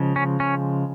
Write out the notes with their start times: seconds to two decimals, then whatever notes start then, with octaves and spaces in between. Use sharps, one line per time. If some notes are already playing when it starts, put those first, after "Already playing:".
Already playing: C#3 F3 G#3
0.16 C#4
0.40 C#4